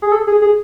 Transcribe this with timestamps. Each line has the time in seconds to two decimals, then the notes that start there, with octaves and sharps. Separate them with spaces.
0.02 G#4
0.12 A4
0.27 G#4
0.42 G#4